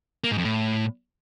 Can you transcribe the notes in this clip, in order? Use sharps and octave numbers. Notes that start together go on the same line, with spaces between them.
A#3
G#2
F2
A2